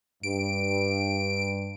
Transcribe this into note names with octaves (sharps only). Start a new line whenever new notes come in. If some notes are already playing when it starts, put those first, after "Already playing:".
G2 D7